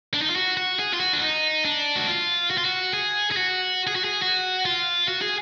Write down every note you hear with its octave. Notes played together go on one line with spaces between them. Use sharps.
D4
D#4
F4
F#4
F#4
G#4
F4
F#4
D4
D#4
D4
F#4
F4
F#4
F4
F#4
G#4
G#4
F#4
G#4
F#4
G#4
F#4
F4
F#4
G#4